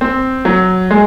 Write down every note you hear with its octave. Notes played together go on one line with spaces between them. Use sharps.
C4
F#3
G#3